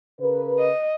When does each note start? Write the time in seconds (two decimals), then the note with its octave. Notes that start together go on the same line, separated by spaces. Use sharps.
0.21 C#3 A#4 B4
0.59 D#5